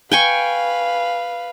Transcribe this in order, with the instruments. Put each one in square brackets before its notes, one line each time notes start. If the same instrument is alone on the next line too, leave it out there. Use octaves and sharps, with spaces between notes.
[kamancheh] B4 F5 [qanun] G5 G#5 C#6